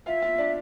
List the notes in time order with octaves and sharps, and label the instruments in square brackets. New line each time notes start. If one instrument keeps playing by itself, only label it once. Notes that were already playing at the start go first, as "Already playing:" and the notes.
[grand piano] F4 F5 [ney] E5
[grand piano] F4 F5
D4 D5